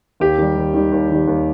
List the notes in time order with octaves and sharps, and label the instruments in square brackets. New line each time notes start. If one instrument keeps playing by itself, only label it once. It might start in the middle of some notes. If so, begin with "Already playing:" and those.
[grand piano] D#2 G4
D#3 G3
D#2
D#3 G3
D#2
D#3 G3
D#2